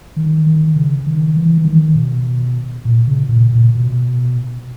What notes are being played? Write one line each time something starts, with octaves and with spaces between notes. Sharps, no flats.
D#3
D#3
C#3
D#3
E3
E3
D#3
B2
A#2
C#3
A#2
A#2
B2